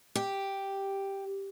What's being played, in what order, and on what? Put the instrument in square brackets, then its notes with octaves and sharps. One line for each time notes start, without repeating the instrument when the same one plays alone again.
[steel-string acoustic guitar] G4